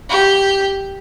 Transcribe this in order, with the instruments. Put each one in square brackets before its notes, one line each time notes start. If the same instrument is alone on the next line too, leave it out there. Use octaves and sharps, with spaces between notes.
[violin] G4